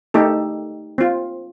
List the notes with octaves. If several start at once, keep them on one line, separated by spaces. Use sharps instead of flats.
A3 D#4 G4 A4
C4 F4